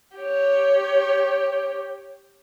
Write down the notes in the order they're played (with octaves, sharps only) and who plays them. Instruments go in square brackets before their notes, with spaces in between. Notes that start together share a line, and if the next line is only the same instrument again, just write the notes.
[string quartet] G4 C#5